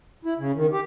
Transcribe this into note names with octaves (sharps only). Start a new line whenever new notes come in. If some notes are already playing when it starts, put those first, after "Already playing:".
E4
C#3
D#3
G4